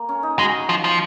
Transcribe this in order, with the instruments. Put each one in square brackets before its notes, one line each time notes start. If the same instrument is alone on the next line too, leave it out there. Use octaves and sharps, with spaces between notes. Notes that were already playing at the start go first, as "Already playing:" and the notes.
Already playing: [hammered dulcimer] A#3
C#4
D#4
[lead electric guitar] G#3 [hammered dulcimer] F#4
[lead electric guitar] F3
F3